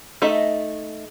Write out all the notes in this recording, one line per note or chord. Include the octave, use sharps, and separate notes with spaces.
A3 D#4 D#5 E5